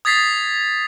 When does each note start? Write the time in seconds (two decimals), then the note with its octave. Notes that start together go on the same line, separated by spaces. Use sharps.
0.05 D#6 G#6 A6 B6 C7